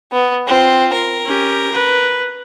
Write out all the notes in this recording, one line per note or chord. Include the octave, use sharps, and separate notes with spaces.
B3
C4 F4
A#4
C#4 G4
B4